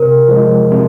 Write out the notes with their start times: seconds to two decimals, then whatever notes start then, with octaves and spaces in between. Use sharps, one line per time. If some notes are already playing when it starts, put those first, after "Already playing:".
Already playing: C3 A#4
0.28 F3 G#3
0.72 C3